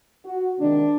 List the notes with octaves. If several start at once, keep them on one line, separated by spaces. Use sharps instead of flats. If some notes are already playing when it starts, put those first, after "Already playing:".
F#4
C3 D#3 G#3 C4 D4